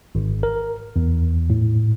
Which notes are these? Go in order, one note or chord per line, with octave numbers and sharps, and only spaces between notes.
G#1
A#4
E2
A2